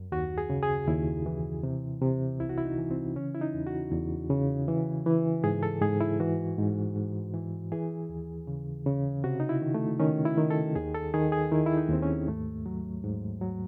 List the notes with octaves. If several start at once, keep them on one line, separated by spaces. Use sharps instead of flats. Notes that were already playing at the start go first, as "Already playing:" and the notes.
Already playing: F#2
D#2 F#4
G#4
C#3
G#4
D#2 E4
E3
C3
C3
C2 E4
F#4
E4
D#4
E3
C4
C#3 C#4
E4
D#4
E2
F#4
E2
C#3
E3
E3
G#2 G#4
A4
G#2 G#4
E4
E3 F#4
G#2
G#2
E3
E3 G#4
D#2
C#3
C#3
C3 F#4
D#4
E4
D#3
A3
D#3 C#4
E4
D#3
A4
D#2 G#4
A4
D#3 G#4
G#4
D#3 E4
E4
D#4
D#2 C4
C#4
G#2 A3
F#3
G#2
F#3